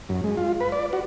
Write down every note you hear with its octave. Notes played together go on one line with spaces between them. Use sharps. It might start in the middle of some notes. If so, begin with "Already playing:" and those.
F#2
G#3
F4
B4
D5
F#4